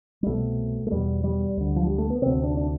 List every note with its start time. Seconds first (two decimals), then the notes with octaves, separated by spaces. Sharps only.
0.23 G3
0.26 C2 B2 A3
0.87 A3
0.91 E2 B2 G3
1.24 G3
1.57 D2 D3
1.76 F3
1.87 G3
1.98 A3
2.10 B3
2.22 D2 C3 C4
2.43 D4
2.57 D4